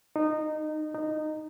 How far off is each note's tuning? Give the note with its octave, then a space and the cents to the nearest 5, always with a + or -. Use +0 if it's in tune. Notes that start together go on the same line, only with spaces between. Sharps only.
D#4 -20
D#4 -15